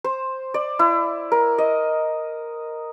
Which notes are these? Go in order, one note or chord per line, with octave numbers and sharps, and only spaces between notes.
C5
D5
E4
A#4
D#5